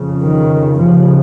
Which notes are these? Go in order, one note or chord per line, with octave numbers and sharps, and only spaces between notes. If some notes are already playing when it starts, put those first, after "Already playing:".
Already playing: F2 C#3
D#3
D#2 C#3 F3